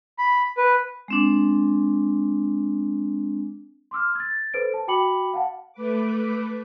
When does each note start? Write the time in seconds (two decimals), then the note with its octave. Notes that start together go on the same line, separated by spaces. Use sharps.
0.19 B5
0.57 B4
1.08 G#3 C4 D4
3.91 C6 D6 E6 F6
4.15 G#6 A6
4.54 A4 B4 C5 D7
4.74 A5
4.88 F#4 G5 B5 D6 C#7 F#7
5.34 F5 F#5 A5
5.72 A3 B4 D6